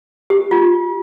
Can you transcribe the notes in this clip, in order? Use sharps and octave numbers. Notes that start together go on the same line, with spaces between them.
G4
F4